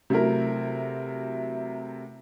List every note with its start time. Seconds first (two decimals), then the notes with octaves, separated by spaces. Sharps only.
0.10 C3 F#3 A3 E4 A#4